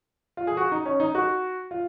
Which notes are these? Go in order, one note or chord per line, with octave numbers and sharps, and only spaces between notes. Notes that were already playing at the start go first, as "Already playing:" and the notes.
F4
G#4
F#4
D#4
C#4
D#4
F#4
F4